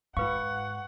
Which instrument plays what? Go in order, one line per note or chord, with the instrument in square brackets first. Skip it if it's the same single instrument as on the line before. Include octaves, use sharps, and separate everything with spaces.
[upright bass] G#2 [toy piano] F4 B4 F5 [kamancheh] F#5 [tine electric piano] C#6